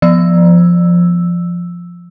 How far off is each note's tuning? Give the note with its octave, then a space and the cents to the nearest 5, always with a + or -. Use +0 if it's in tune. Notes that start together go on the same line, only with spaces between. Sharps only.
F3 +0 E6 +0